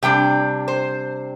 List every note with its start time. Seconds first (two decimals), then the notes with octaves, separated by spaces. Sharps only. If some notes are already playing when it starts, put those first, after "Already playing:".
0.03 C3 G3 D4 G5
0.68 C5